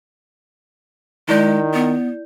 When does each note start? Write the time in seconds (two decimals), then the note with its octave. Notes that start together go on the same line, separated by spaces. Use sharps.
1.29 D#3 G#3 E4 D5 G6
1.74 B3